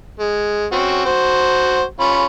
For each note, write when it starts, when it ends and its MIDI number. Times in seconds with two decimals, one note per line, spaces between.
0.20 0.65 56
0.72 1.05 60
0.72 1.05 61
0.72 1.05 66
1.06 1.83 66
1.06 1.83 72
2.00 2.25 61
2.00 2.25 65
2.00 2.25 83